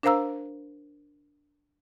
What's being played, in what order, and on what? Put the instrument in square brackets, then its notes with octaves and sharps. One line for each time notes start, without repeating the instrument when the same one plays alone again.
[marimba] D4 A#4 C5 F5 A#5 E6